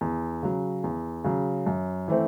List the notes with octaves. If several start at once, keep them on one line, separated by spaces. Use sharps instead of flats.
E2
C#3 F#3
E2
C#3 F#3
F#2
E3 A3 C4